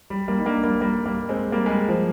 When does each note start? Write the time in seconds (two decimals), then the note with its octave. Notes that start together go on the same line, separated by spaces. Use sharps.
0.10 G3
0.28 G3 A#3
0.39 D#4
0.46 A#3 D4
0.64 G3 A#3
0.81 G3 A#3
1.06 G3 A#3
1.29 G#3 C4
1.52 G3 A#3
1.66 G#3
1.70 G3
1.88 F3